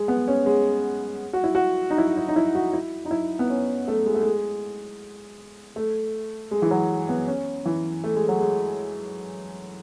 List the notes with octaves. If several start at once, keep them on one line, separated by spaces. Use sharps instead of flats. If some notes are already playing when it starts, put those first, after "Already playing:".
Already playing: G#3
B3
C#4
G#3
F#4
E4
F#4
D#4
E4
E4
D#4
E4
F#4
E4
D#4
E4
B3
C#4
A3
G#3
A3
G#3
A3
G#3
E3
F#3
B3
C#4
E3
A3
G#3
F#3
G#3